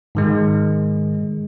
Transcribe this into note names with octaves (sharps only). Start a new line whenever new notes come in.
G#2 D#3 G#3